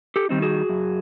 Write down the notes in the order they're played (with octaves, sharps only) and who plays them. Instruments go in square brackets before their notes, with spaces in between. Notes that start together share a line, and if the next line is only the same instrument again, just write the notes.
[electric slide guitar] G4 A4
D#3 G3 C4 D#4
F#4 G#4
F#2